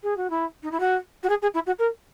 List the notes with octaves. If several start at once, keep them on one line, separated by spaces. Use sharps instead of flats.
G#4
F#4
E4
D#4
E4
F#4
F#4
G#4
G#4
E4
F#4
A#4